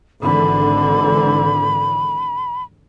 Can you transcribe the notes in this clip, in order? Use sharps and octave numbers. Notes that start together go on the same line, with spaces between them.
G#1 D3 E3 B5